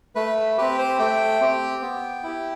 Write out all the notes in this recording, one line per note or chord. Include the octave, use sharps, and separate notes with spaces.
A3 B4
C4 G4 B4
C5
A3 G5
C4 G4
B3
E4 G4